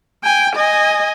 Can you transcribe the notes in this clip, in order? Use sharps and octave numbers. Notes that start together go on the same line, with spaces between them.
G5 G#5
D#5 G#5